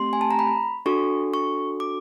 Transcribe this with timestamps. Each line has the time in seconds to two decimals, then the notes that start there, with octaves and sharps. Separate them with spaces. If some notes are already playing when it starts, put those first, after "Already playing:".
Already playing: A3 C4 G4 C6
0.13 G#5
0.21 A5
0.31 A#5
0.39 B5
0.86 D4 F#4 A4 C#6
1.34 C#6
1.80 D6